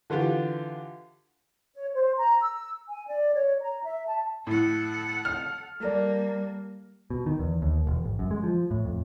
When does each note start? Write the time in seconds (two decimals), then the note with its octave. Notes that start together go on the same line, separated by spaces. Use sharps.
0.10 D3 E3 F4 G4
1.74 C#5
1.93 C5
2.17 A#5
2.41 E6
2.89 G#5
3.09 D5
3.35 C#5
3.61 A#5
3.84 E5
4.07 A5
4.47 A2 A4 F#5
5.25 F6
5.80 G3 A#3 A4 A#4 D5
7.10 B2
7.26 D#3
7.39 E2
7.62 D#2
7.87 E1
8.04 G#1
8.19 F#2
8.31 G#3
8.43 F3
8.71 A2
8.85 F2